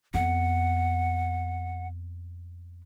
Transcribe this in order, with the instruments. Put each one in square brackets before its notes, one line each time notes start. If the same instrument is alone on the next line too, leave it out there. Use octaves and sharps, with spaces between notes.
[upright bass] F2 B3 [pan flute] F#5